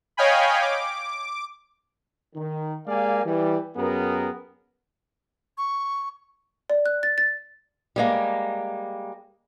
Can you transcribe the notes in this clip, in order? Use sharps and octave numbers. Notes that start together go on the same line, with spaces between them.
C#5 D#5 F5 G5 G#5 B5
D6
D#3
G#3 A#3 G4 D5 F5 G#5
E3 G3
F#2 B3 G4 G#4 A#4
C#6
D5
F#6
A6
A6
G3 G#3 A#3